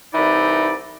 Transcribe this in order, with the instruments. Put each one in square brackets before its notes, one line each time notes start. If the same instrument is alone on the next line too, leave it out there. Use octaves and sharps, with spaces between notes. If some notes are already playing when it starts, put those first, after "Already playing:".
[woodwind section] C2 E3 D#4 D5 B5